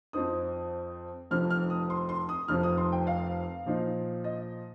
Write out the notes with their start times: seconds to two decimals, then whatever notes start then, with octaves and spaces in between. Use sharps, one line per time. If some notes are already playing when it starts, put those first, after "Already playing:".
0.13 F2 F3 C4 D#4 D#6
1.31 F1 F2 F3 F6
1.50 F6
1.70 D#6
1.90 C6
2.09 C6
2.29 D#6
2.48 F1 F2 F3 F6
2.63 D#6
2.78 C6
2.92 G5
3.07 F5
3.66 A#2 F3 D#4
4.24 D#5